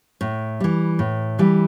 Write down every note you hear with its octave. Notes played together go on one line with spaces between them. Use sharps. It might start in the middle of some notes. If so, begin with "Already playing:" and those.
A2
E3 G3
A2
E3 G3